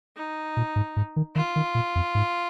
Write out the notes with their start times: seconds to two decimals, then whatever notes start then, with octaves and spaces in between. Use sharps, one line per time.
0.17 D#4
0.57 A#2
0.76 G#2
0.96 G#2
1.16 D#3
1.35 D#3 F4
1.56 D#3
1.75 A#2
1.95 F2
2.15 G#2